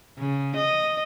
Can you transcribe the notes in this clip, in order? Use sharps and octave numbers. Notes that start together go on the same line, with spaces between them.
C#3
D#5